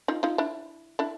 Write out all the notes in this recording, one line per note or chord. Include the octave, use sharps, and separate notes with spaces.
D#4 F4
D#4 F4
D4 E4
D4 E4